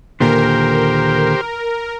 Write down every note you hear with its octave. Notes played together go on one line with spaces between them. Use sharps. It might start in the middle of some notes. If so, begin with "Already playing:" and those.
D#2 A#2 D3 G4 A#4 C5